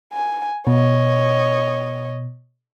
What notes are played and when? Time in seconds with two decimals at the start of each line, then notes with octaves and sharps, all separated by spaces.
0.13 G#5
0.67 B2 C#5 D#5